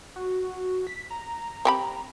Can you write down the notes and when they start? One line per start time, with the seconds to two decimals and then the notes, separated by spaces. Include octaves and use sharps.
0.16 F#4
0.87 B6
1.10 A#5
1.65 C4 G4 B5